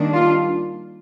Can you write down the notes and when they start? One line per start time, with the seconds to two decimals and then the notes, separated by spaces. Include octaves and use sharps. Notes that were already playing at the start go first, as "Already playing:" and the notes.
Already playing: D#3 G3 A#3 D4
0.14 F4